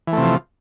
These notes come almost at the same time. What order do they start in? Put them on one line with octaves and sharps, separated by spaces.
E3 A3 C3 F3